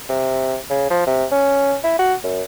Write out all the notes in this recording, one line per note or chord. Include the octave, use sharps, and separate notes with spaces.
C3
C#3
F3
C3
C#4
E4
F#4
F#2